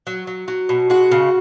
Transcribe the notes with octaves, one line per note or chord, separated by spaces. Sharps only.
F#3
F#3
F#3
B2
G#3 F#4
C#3